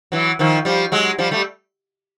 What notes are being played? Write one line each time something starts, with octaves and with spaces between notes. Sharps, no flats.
E3 F#3
D#3 F3
F3 G3
F#3 G#3
F3 G3
G3 A3